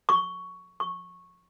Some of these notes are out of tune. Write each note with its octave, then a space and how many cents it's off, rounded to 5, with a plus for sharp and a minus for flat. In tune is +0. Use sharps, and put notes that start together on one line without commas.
C#6 +10
C#6 -10